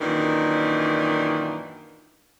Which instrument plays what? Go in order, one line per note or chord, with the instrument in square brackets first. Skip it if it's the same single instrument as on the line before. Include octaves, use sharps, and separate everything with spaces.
[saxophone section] F#2 A#2 D#3 E3 D4